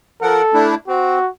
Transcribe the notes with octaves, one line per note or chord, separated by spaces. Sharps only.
F3 A4 A#4 F#5
A3 D4 E4
C4 F#4